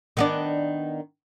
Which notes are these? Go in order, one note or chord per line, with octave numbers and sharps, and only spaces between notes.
D#3 B3 D4